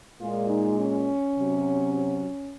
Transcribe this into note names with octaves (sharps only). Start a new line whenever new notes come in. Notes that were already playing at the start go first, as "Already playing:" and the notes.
A#2 G#3 F4
D#4
C#4
C3 F#3